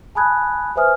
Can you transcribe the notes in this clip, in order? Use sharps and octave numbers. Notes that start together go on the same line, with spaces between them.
G#5 A5 B5 D#6 F#6 G#6
B4 C5 E5 G#5 D#6 F6